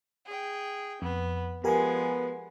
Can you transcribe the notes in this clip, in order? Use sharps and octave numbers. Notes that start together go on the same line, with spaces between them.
G#4 G5
F2 B3
F3 G#3 B3 G4 A#4 G#5